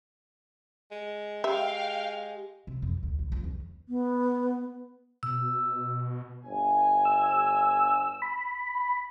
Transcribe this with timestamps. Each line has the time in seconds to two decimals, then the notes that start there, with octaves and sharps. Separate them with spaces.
0.91 G#3
1.44 G#3 G4 E5 F5 G5
2.67 C3
2.82 F2
3.03 D2
3.19 B1
3.32 C#2
3.43 E2
3.89 B3
5.23 B2 E6
6.45 G1 G#5
7.05 E6
8.22 B5